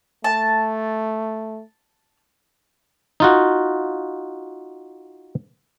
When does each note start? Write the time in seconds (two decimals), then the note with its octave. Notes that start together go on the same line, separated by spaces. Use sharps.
0.24 A3 A5
3.20 D#4 F4 F#4